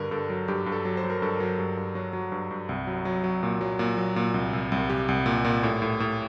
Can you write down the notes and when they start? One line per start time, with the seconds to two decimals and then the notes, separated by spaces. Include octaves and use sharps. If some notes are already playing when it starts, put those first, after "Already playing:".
Already playing: G2 D3 A#4
0.11 G2 A4
0.29 F#3
0.48 G2 G4
0.66 G2
0.72 A4
0.85 F#3
0.97 C5
1.04 F#3
1.10 A#4
1.22 G2 A4
1.36 F#3 A#4
1.59 G2
1.77 G2
1.95 F#3 F#4
2.13 F#3
2.32 G2
2.51 G2
2.69 C2
2.87 F#3
3.05 F#3
3.24 F#3
3.43 A#2
3.61 F#3
3.79 A#2
3.97 F#3
4.16 A#2
4.34 C2
4.53 C2
4.72 C2
4.90 C2 G4
5.08 C2
5.26 A#2
5.44 A#2
5.63 A2
5.82 A2
6.00 A2